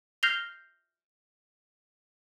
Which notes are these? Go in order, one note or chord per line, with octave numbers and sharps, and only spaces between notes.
F6 G6 A#6 C7 F7 G7